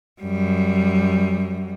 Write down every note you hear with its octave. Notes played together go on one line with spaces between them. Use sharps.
F#2 G3